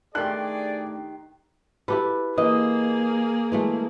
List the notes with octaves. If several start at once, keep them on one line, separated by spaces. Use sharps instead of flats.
D#3 A3 D4 G4 G#4 D5 C6 F#6
E4 G4 A4 B4
E3 A#3 G#4 D#5
E3 G#3 A3